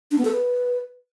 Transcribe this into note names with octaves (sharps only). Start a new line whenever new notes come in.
D4
B3
A4
B4